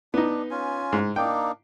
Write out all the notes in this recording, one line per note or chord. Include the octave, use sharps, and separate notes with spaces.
B3 D4 D#4
C#4 F4 G#5
G#2
A#3 D4 D#4 G5